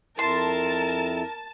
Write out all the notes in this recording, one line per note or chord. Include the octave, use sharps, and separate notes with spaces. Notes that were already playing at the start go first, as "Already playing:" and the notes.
F2 E4 A#4 A5 C6